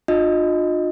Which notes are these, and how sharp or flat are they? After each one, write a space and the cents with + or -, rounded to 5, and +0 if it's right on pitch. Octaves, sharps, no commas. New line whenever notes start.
D4 +45 F4 +30 D#5 +0